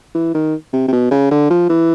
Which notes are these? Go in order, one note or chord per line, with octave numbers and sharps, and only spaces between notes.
E3
D#3
C3
C3
B2
C#3
D3
F3
E3